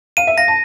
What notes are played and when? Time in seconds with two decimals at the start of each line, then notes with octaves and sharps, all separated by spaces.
0.17 F5 D#7
0.27 E5
0.37 F5 A#6
0.48 A5